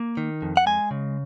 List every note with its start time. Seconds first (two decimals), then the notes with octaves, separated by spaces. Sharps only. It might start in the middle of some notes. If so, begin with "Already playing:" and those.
Already playing: A#3
0.17 D#3
0.42 F2
0.57 F#5
0.66 G#3 G#5
0.91 C#3